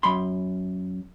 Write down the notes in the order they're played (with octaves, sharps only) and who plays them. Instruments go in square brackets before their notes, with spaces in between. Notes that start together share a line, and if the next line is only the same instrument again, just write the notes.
[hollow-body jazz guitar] F#2 B5 C6